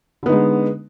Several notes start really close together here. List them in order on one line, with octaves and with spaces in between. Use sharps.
D3 B3 D#4 G#3